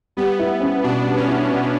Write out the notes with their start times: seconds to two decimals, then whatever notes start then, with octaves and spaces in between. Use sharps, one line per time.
0.17 G3 B3
0.39 E4
0.60 C#4
0.83 B2 D4
1.05 G3
1.16 C#4
1.28 E4
1.50 B2